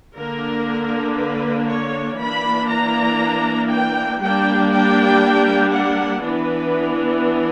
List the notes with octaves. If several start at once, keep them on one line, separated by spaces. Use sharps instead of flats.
D3 A#3 D4 A#4
B4
C#5
E3 A#3 D4 B5
A#5
G5
G3 A#3 D4 G5
G5
F#5
E3 B3 D4 B4